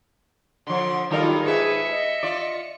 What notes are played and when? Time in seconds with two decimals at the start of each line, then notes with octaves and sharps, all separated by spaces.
0.67 D3 F3 C6
1.11 D#3 F#3 G3 D#4 F4 A4 A#4
1.45 G#2 G#4 B4 E5 C#7
1.91 D#5
2.23 F4 D5